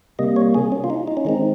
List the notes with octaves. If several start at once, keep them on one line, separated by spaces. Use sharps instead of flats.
C3 G3 A#3 D#5
C#5
G#4
C#4
F4
D#4
D#4
C#4
D#3 G#3 C4 D#4